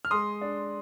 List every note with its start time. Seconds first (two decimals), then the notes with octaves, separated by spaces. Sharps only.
0.05 F6
0.11 G#3 C6 D#6
0.41 D4